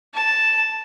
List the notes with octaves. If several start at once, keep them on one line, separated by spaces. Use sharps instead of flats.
A5